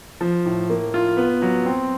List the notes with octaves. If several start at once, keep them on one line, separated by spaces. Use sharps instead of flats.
F3
A2
A#3
F4
B3
F#3
C4